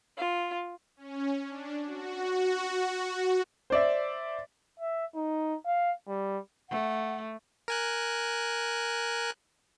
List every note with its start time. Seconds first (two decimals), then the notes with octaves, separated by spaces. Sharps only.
0.17 F4
0.97 C#4
1.48 D4
1.85 F#4
3.70 C5 D5 E5
4.79 E5
5.15 D#4
5.66 F5
6.08 G3
6.70 A3 F#5
7.68 A#4 G#5 F#6